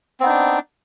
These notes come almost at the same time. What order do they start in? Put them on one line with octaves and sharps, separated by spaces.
C4 B3 D#4 D4